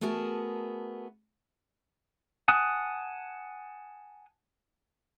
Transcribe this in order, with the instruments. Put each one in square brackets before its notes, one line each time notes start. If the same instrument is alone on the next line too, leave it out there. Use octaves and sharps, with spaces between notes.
[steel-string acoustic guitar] A3 B3 F#4 G#4 A#4 A5
[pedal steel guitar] F#5 G#5 A5 D#6 F#6